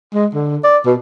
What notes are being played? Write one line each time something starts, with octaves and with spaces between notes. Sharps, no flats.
G#3
D3
D5
B2